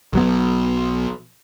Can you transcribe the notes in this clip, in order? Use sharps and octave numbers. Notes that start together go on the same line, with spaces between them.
B1 F#3 B3